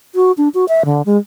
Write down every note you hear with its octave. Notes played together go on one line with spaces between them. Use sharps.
F#4
D4
F#4
E5
D3
G#3